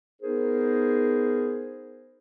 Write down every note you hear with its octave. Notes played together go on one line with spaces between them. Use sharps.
B3 D#4 G#4 A#4 C5